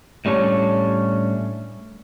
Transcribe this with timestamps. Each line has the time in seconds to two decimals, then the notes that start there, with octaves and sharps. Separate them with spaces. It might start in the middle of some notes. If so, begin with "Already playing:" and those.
0.25 A2 G3 C#4 D4 C#5